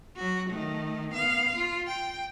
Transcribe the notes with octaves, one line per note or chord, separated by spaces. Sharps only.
F#3 F#4
D#3 A3
B3 F5
F4
G5